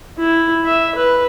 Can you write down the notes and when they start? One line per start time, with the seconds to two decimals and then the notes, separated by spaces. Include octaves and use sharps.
0.18 E4
0.65 E5
0.95 B4